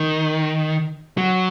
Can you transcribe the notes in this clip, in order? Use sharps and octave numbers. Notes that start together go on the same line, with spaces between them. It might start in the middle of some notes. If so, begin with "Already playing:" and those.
Already playing: D#3
F#3